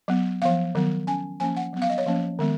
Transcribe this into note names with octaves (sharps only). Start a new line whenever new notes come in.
F#3 B3
F3 B3 F5
D#3 F#3 B3
F#3 C#4 G#5
F3 A#3 C#4 G#5
F#5
F#3 B3
F5
D#5
C#5
F3 A#3 C#4
D#3 G#3 B3